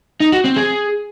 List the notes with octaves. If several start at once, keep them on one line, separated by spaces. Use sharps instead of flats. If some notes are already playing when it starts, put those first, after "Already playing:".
D#4
F#4
C4
G#4